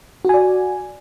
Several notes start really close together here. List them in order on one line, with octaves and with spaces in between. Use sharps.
F#4 G#5 D5